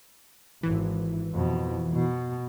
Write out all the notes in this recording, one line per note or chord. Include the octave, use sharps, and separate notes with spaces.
G#1 E3
F2 B2
B2